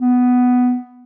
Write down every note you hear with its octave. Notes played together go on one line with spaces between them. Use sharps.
B3